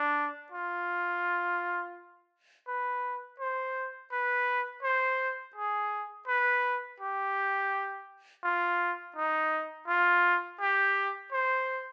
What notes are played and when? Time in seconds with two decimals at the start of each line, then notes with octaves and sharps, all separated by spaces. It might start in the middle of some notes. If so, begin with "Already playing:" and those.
Already playing: D4
0.52 F4
2.68 B4
3.40 C5
4.12 B4
4.83 C5
5.56 G#4
6.28 B4
7.00 G4
8.43 F4
9.16 D#4
9.88 F4
10.61 G4
11.32 C5